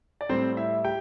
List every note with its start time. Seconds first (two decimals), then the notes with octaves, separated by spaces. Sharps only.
0.21 D5
0.29 A2 G3 C4 C5
0.57 E4 E5
0.84 G4 G5